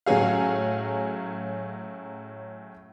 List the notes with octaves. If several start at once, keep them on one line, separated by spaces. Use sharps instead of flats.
A2 F#3 C#4 G#4 F5